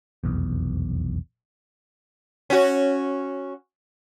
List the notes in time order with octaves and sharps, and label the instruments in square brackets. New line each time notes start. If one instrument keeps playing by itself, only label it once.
[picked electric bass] F1 B1 E2
[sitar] C#4 F#4